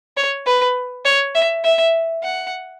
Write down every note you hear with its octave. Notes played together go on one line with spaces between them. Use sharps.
C#5
B4
C#5
E5
E5
F#5